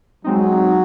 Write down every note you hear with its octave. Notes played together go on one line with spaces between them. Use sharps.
F#3 G#3 C4 D#4